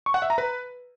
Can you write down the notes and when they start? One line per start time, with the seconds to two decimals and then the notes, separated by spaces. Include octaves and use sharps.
0.06 C#6
0.14 F#5
0.22 E5
0.30 A#5
0.38 B4